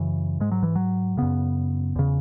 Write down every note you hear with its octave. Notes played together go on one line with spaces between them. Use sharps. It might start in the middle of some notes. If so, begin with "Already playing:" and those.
Already playing: F#2 C#3 E3
G#2 G#3
F#3
E3
F#3
F#2 C#3 B3
E2 C#3